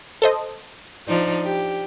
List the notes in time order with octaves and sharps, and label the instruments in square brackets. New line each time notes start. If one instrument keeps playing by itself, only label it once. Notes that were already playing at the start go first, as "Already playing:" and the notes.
[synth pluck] A4 C5 D#5
[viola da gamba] F3 D4 D#4
G4